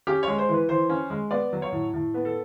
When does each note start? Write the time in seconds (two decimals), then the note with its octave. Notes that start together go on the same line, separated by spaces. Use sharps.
0.07 C#4 G4
0.23 G#3 C#5
0.38 C5
0.49 E3
0.54 B4
0.69 E3 C5
0.90 C#4
1.10 G#3
1.31 B3 D5
1.53 F#3
1.62 C#5
1.72 A2
1.94 A2
2.14 B3
2.25 A4